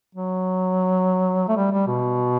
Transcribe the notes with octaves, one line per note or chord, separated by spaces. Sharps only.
F#3
A3
G3
G3
B2